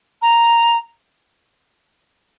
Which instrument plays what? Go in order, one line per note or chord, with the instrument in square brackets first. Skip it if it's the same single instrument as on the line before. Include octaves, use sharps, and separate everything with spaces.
[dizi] A#5